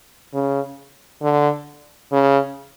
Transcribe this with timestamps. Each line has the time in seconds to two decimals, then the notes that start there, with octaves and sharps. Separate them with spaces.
0.34 C#3
1.22 D3
2.12 C#3